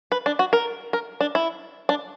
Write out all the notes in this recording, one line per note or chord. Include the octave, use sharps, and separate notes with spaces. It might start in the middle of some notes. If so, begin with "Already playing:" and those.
B4
D4
F#4
A#4
A#4
D4
E4
D4